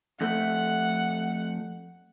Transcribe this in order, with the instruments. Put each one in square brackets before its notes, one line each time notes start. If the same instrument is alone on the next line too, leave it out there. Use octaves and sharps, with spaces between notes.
[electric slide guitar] F2 A3 [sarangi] F#5